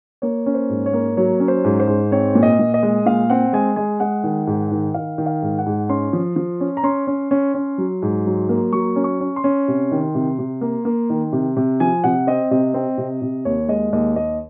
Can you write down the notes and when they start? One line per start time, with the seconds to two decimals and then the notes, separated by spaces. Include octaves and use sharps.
0.22 A#3 C#5
0.46 C#4
0.54 C5
0.69 G#2
0.86 C#5
0.93 A#3
1.17 F#3 C#5
1.40 C#4
1.48 C5
1.64 G#2
1.80 C5
1.87 G#2
2.12 C4 C#5
2.35 A#2
2.43 D#5
2.59 A#2
2.74 D#5
2.83 G#3
3.06 A#2 F5
3.30 C4 F#5
3.53 G#3 G#5
3.76 G#3 G#5
4.00 G#3 F#5
4.24 D#3
4.47 G#2
4.71 D#3
4.94 D#3 F5
5.18 D#3
5.26 F5
5.42 G#2
5.59 F#5
5.66 G#2
5.89 C#4 C6
6.13 F3
6.36 F3
6.61 C#4
6.77 A#5
6.83 C#4 C6
7.07 C#4
7.31 C#4
7.54 C#4
7.78 F#3
8.02 G#2
8.26 F#3
8.49 A#3
8.72 F#3 C#6
8.96 C#4
9.04 C#6
9.21 C#4
9.36 C6
9.44 C#4
9.68 C3
9.92 D#3
10.15 C3
10.39 C3
10.61 A#3
10.85 A#3
11.10 D#3
11.33 C3
11.57 C3
11.80 F3 G#5
12.04 C3 F#5
12.27 C4 D#5
12.51 C3 D#5
12.74 C4
12.98 C3
13.22 C3
13.45 D#2 C#5
13.68 G#3 D#5
13.93 D#2 D#5
14.16 D#2 D#5